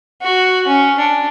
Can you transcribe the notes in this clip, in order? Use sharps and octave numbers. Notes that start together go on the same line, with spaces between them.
F#4
C#4
D4